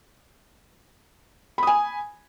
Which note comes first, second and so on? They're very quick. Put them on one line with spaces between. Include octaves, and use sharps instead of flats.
B5 D#6 G#5